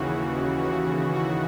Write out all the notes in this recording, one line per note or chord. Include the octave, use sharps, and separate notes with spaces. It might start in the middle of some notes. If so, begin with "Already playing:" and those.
Already playing: D#2 C#3 E3 F#4
F#4
F#4